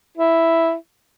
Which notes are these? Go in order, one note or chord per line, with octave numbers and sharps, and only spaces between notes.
E4